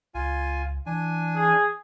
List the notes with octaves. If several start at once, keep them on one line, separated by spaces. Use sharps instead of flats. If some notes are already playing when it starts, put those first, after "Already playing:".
C#2 F4 G#5
E3 D4 G#5
G#4